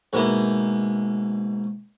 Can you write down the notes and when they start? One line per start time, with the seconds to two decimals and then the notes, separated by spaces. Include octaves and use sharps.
0.13 G#2 B2 A#3 E4